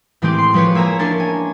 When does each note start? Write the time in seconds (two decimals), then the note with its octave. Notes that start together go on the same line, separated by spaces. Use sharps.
0.22 A2 E3 G#3 C4 G4 D6
0.38 C6
0.54 F3 G#3 B4 C#5
0.75 A#3 E5 G#5 A#5
0.99 C#4 D4 A#4 A5
1.20 G#5